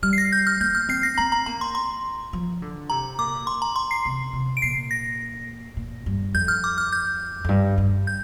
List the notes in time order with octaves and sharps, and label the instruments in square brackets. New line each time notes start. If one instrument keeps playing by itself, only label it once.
[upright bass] G3 [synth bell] F6
[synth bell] C7
A#6
G6
F6
[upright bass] A#3 [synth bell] G6
[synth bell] F6
[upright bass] C4 [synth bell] C7
[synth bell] A#6
[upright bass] C4 [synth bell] A#5
[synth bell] A#5
[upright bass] A#3 [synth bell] A#5
[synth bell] C6
C6
[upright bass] F3
D3
[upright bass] C3 [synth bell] A#5
[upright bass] A#2 [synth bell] D6
[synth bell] C6
A#5
C6
C7
[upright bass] C3
C3
[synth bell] D7
[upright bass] A#2 [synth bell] C7
[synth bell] A#6
[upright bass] A#2
G2
[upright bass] F2 [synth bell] G6
[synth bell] F6
D6
F6
G6
[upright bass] F2
G2
G2
[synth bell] G6